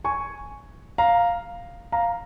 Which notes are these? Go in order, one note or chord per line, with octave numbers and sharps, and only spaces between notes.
G#5 C#6
F5 A#5
F5 A#5